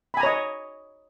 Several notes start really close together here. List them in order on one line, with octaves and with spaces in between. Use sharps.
B5 G#5 A#5 C#5 D#5